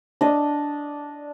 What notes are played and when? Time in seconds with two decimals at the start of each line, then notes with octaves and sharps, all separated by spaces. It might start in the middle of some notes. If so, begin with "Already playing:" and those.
0.21 D4 D#5